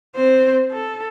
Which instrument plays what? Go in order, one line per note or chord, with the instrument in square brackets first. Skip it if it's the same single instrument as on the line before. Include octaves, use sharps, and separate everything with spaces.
[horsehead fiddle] C4 C5
A4